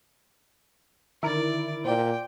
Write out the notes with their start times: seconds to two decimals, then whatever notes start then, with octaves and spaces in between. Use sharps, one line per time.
1.23 D3 D#3 E4 A#4 D5 D7
1.85 A#2 C5 D5 G5